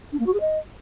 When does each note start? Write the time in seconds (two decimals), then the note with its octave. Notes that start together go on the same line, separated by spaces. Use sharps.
0.13 D4
0.20 A#3
0.26 F#4
0.33 G#4
0.40 D#5